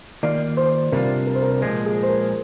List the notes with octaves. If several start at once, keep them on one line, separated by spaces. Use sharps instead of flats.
D#3 A#3 F4 D5
C5
C3 G3 D4 F4 A#4
A#4
C5
A#4
A#2 F3 G#3 A#4
G#4
C5
A#4